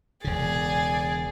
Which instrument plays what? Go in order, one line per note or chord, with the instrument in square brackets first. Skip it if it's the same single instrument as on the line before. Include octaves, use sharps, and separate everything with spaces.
[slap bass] E1 C#3 [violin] G#4 D5